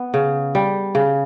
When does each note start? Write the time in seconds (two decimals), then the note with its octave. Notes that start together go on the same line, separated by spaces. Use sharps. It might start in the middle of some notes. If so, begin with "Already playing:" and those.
Already playing: B3
0.14 C#3
0.55 G3
0.95 C#3